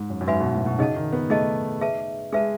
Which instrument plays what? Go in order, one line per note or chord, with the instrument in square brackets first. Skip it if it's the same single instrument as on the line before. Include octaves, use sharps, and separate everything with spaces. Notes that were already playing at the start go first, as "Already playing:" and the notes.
Already playing: [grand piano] G#2
F#2
F#2
[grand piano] G#2 [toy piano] F#4 B4 E5 G#5 B5
[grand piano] B2
A2
B2
[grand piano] C#3 [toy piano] D#4 G#4 D#5 F#5 A5
[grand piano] D#3
B3
[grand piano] A3 [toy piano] D#4 G#4 D#5 F#5 A5
[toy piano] G#4 B4 E5 A5
[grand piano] G#3 [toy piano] G#4 B4 E5 A5